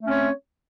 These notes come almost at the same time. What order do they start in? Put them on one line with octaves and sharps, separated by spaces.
A3 C4 C#4 C#5